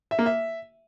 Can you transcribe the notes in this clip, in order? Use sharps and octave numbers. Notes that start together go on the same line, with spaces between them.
E5
A#3
E5